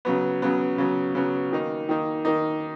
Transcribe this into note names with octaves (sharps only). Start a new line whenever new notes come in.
C#3 F#3 B3
C#3 F#3 B3
C#3 F#3 B3
C#3 F#3 B3
D#3 A#3 D#4
D#3 A#3 D#4
D#3 A#3 D#4